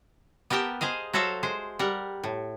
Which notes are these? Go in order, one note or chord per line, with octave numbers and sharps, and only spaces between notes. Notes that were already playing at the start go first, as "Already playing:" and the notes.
B3 G4 A#4 G5 A5
G#4 C5 D#5 F5
F#3 F#4 A4 C5 E5 F5
G#3 C5
G3 A#4 F#5
A2